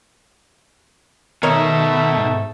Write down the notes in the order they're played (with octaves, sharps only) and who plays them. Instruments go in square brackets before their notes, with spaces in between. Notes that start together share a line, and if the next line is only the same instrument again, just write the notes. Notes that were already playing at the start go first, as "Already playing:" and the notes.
[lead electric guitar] B2 [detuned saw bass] D#3 [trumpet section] A3 D#4 E5 [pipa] A#4 C#5 D#5
[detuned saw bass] G#2